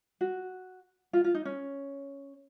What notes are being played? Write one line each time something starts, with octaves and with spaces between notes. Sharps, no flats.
F#4
F4
F4
D#4
C#4